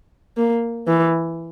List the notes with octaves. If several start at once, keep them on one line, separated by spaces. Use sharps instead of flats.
A#3
E3